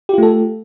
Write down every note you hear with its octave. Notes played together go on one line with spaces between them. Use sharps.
A3 F4 G4 A4